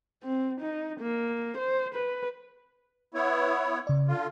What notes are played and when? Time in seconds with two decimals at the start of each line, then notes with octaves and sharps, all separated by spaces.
0.23 C4
0.61 D#4
1.00 A#3
1.58 C5
1.94 B4
3.14 B3 E4 C#5
3.87 C#3 D5
4.08 D3 F4